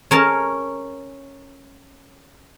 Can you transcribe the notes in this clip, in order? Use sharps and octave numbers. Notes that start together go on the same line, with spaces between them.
C#4 A#4 C#5 A5